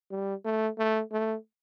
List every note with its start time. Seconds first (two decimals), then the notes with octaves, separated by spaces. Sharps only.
0.11 G3
0.45 A3
0.78 A3
1.12 A3